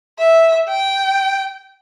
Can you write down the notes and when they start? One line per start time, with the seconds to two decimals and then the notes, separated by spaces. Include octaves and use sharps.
0.19 E5
0.69 G5